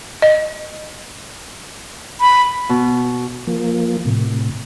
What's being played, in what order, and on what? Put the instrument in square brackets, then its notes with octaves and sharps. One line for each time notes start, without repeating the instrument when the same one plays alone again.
[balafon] D#5
[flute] B5
[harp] B2
[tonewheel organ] F3 A#3
A2 C3